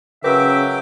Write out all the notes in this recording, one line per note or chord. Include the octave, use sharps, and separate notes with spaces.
C#3 F#3 A#4 B4 E5 G5 D6